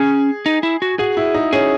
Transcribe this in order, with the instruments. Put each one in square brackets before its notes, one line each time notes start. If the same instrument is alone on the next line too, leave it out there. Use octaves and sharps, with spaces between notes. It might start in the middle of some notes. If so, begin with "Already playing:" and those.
Already playing: [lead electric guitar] C#4 [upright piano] G#4
[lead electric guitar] D#4
E4
F#4
[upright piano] F#4 [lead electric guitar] G#4
[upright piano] E4
D#4
[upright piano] C#4 [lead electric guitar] G#4